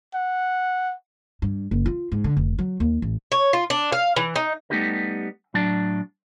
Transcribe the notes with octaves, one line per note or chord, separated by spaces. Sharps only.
F#5
G2
F#1
F4
G#2
D3
F1
F#3
D#2
A1
C#5
F4
D4
F5
E3
D#4
G3 A3 B3 D#4 G4 A#4
A2 F#3 D4 D5 A5